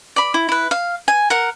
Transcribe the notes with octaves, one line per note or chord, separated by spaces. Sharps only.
D5 B5
E4
E4 B4
F5
G#5
A#4 F#5